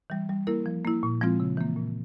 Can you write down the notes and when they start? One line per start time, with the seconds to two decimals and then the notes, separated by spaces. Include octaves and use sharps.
0.10 E3 G3
0.29 G3
0.47 A#3 E4 A#4
0.66 F3
0.85 A#3 E4
1.03 A#2
1.21 F3 G#3 C4 F4
1.40 C#3
1.57 E3 A#3
1.76 A#2